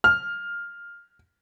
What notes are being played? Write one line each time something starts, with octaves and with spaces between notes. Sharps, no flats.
F6